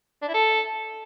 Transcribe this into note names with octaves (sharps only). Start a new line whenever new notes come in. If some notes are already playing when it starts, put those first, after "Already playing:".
D4
E4
A4